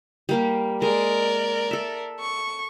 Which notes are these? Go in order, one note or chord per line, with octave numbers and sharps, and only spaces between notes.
G3 A#3 G4
G#3 A#4 D5
A4 E5
C#6